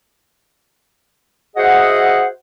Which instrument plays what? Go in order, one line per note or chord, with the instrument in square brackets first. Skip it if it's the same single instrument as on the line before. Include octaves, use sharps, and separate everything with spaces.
[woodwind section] F#4 G#4 C5 D#5 E5 F#5